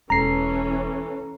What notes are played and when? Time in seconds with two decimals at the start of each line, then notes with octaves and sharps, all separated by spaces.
0.10 E1 E3 C#4 A4 A#5 C7